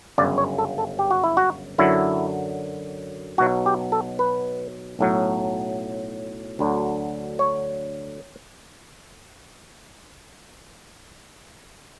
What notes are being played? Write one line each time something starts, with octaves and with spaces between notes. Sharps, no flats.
G1 F#2 C#3 D5
C#5
A4
A4
G4
F#4
E4
F#4
F#2 D3 F#3 E4
B1 B2 F#3 F#4
G4
A4
B4
B1 A2 F#3
D2 D3 F#3
C#5